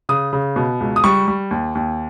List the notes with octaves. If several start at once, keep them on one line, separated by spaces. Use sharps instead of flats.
C#3 D#6
C#3
B2
C#2
D#6
G3 C#6
G3
D#2
D#2